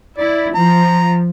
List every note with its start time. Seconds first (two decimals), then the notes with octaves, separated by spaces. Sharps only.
0.18 E4 D5
0.55 F3 A#5